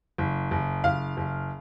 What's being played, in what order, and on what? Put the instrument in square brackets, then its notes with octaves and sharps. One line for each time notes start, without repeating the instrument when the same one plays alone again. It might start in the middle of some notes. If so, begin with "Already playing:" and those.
[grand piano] F#1
F#1
F#1 F5
F#1